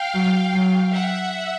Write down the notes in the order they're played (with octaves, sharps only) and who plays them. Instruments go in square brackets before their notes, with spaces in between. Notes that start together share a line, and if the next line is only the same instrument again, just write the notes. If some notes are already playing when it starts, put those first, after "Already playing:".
Already playing: [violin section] F5 G5
[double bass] F#3
F#3
[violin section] E5 F#5